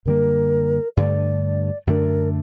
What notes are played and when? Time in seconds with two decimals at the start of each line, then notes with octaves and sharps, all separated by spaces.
0.05 F#2 D3 G3 A#3 A#4
0.96 G2 D3 A3 D5
1.87 F#2 D3 A3 D4 A#4